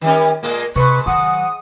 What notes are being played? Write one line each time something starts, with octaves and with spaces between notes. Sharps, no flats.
D#3 G3 C#4
A#2 G#3 A#3
G#2 C3 B4 C#6
D#3 F#3 F#5 D#6